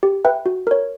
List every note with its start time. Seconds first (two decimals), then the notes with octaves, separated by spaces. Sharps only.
0.03 G4
0.25 B4 E5 G5
0.46 F#4
0.67 A#4 C#5